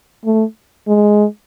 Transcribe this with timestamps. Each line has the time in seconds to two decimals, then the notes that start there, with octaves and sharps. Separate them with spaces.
0.25 A3
0.88 G#3